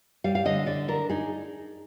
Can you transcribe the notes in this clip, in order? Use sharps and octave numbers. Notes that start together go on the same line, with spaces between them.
G3 F5
F5
D3 D#5
D3 D5
D4 A#4
D#4 G#4